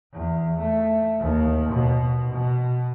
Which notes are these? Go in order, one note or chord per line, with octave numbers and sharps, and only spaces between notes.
E2
A3
D#2
B2
B2